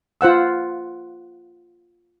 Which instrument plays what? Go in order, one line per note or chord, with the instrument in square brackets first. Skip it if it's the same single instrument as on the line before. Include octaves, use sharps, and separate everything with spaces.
[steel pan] F4 C5 F#5 E6